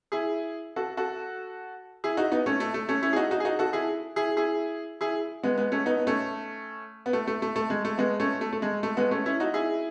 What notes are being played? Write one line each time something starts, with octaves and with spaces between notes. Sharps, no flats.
E4 G#4
F#4 A4
F#4 A4
E4 G#4
D#4 F#4
B3 D#4
A3 C#4
A3
A3
A3 C#4
C#4 E4
G#4
D#4 F#4
D#4 F#4
G#4
D#4 F#4
F#4 A4
E4 G#4
E4 G#4
E4 G#4
E4 G#4
G#3 B3
G#3 B3
A3 C#4
B3 D#4
B3
A3 C#4
B3
A3
A3
A3
A3
G#3
A3
G#3 B3
A3 C#4
A3
A3
G#3
A3
G#3 B3
A3 C#4
C#4 E4
D#4 F#4
E4 G#4